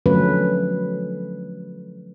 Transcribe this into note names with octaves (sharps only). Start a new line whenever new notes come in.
D3 F3 F#3 A3 C#4 B4